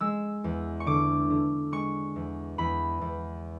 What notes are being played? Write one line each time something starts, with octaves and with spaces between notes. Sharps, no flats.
G#3 E6
E2
C#6
D3 D6
D3
G#3 C#6
E2
E2 B5
E2